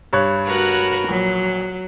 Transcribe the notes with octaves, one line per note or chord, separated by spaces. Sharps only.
G2 C#5 F#6
F#4 A#4 B4
A#1 F#3